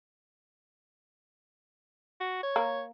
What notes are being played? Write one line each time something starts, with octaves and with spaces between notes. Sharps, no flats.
F#4
C#5
A#3